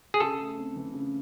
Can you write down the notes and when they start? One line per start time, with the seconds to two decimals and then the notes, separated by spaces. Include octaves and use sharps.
0.14 G#4
0.20 C#3 A4
0.39 A3
0.58 C4
0.76 E3
0.94 C#3